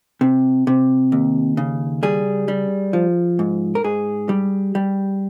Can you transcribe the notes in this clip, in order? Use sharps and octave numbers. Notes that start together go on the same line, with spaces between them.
C3
C3
D#2
C#3
G3 G#4
G3
F3
G#2
A#4
G#2 G#4
G3
G3